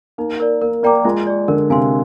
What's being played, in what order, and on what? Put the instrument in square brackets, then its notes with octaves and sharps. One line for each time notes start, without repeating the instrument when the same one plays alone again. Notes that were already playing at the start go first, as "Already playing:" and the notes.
[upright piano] A#3 [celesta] D#4
[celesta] A#4 D5
[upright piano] A#3 [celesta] A#4
[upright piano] A#3 [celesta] D5 G5 A#5 D6
[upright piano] G#3 [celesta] F4
[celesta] G#4 D5
[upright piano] D3 [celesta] A#4
[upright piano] C3 [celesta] F5 G#5 C6